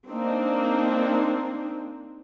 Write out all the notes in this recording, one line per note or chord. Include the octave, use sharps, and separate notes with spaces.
A#3 C4 D4 D#4